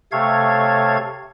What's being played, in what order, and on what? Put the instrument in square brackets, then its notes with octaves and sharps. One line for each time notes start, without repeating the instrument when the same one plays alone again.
[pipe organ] C3 A3 A4 C#5 F5 G#6